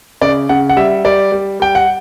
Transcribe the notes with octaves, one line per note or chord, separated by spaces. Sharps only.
C#3 D5
C#3 F#5
F#5
G3 E5
G3 D5
G3
G3 G5
F#5